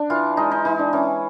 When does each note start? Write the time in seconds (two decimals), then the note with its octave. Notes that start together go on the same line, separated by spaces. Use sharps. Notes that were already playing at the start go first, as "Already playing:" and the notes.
Already playing: D4
0.10 E3 F4
0.37 G#3 D#4
0.51 D#4
0.65 E3 D#4
0.79 D4
0.93 E3 C#4